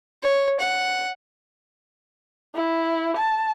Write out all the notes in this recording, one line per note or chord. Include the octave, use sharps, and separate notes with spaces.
C#5
F#5
E4
A5